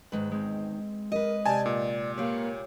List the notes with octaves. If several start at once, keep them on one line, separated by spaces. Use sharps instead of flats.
E2 G#2 D#3 G#3 B4
G#3 C4
A#4 B4 D#5
C3 G4 D5 G#5 A5
A#2
A#3 F4 G4 B4 C#5 F5